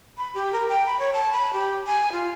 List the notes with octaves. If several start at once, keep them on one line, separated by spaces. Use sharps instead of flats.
B5
G4
A#4
G5
B5
C#5
A5
B5
G4
G#5
F4